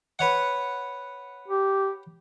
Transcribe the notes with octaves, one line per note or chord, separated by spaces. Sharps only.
B4 C#5 F#5
G4